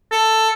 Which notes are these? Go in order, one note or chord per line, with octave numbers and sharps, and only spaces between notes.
A4